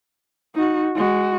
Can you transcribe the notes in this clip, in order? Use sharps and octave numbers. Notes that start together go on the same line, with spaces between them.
D#4 F#4
G#3 F#4